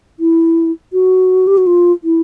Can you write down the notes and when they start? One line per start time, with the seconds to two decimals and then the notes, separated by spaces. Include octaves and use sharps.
0.20 E4
0.93 F#4
1.47 G4
1.57 F#4
1.67 F4
2.04 E4